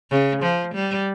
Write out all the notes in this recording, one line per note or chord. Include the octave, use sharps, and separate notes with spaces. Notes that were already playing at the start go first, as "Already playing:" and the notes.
C#3
F3
G3